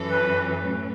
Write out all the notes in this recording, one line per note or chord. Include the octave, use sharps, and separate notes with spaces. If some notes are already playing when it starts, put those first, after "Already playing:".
Already playing: F#2 E3 C#4 A4
B4
A2 F#3 C#4